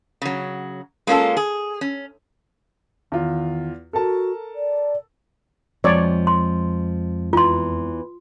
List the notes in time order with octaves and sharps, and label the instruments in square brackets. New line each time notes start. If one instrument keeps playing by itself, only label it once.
[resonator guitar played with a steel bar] C#3 F#3
G#3 A#3 C#4 F4 A4
G#4
C#4
[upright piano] E2 F4 [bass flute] D#3
[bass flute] F#4 [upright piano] A4 A#4 A5
[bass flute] D5
[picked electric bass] F2 G#3 C4 [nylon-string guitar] F3 [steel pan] C#5 D5
[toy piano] C6
[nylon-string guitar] E2 E3 [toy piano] F4 C6